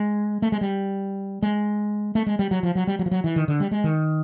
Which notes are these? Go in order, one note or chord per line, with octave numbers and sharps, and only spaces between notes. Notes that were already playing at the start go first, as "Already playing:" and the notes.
Already playing: G#3
A3
G#3
G3
G#3
A3
G#3
G3
F#3
F3
F#3
G3
F#3
F3
F#3
E3
D#3
D3
G3
G#3
D#3